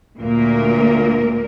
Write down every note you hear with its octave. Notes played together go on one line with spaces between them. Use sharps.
D2 A#2 A#3 A#4